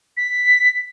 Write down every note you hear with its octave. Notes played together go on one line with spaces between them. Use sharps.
B6